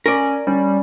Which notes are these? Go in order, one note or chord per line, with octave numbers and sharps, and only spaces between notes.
C#4 A#4 D5
G3 C#4